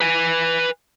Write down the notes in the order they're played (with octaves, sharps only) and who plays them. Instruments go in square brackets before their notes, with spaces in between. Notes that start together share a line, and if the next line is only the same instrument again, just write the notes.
[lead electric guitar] B4 G#5